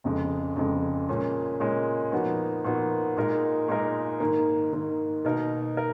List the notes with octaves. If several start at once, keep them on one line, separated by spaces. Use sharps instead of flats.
F1 F2 C#3 G#3
F1 F2 C#3 G#3
A#2 G#3 C#4
A#2 G#3 C#4
A#2 F3 B3 D#4 F#4
A#2 F3 B3 D#4 F#4
A#2 G#3 D#4 A#4
A#2 G#3 D#4 A#4
G#2 D#3 A#3
G#2 D#3 A#3
B2 A#3 D#4 A#4
A#4